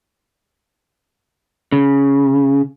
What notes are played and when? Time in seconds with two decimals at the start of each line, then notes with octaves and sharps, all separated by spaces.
1.72 C#3